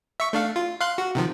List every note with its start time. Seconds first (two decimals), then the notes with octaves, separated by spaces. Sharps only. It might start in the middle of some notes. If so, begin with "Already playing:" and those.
0.20 E5 C#6
0.33 A3 D4 F5
0.56 F4
0.81 F5 C6 F#6
0.98 F#4
1.15 C3 D#3 F3